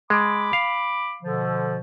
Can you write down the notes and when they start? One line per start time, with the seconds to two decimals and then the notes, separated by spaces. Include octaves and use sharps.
0.10 G#3 B5 D6
0.53 F5
1.22 B2 D3 F3